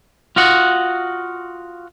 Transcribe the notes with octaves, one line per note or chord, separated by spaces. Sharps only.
F4 F#4 D#5 F#5